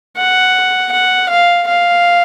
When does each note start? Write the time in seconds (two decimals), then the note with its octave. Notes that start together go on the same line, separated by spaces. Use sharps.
0.17 F#5
0.92 F#5
1.29 F5
1.67 F5